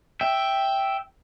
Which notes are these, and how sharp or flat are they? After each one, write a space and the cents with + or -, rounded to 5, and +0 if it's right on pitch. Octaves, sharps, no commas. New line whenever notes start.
E5 +0 G5 +0